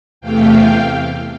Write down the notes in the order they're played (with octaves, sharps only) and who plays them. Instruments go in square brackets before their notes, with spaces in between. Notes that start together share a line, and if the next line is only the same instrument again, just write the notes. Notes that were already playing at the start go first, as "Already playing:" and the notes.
[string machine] E2 C3 E3 A3 F5 G5